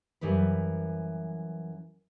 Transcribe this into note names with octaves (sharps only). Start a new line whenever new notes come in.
F#2 E3 G3 B4